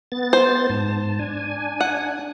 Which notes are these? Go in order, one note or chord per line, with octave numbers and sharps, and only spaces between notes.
B3 A6
C5
G#2 A5
D4 G#5
F#5